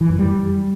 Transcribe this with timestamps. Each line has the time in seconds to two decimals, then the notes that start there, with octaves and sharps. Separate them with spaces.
0.01 E3
0.10 F#2
0.19 G3